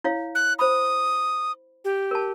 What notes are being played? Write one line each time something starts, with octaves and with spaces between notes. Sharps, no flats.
E4 C#5 F5
F#6
C5 B5 D#6
G4
A#4 A5